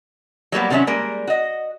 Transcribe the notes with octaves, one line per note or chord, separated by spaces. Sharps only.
F#3 G3 A#3 B3
C3 D#3 F#3 C#4 E5
G3 G#3 A#3 A#4
F#4 D#5